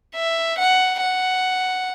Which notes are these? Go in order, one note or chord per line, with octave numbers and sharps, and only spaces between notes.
E5
F#5
F#5